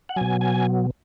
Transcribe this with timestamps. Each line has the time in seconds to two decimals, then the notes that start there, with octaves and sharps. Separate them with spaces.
0.09 F#5
0.16 B2 F#3 G#5
0.41 G#5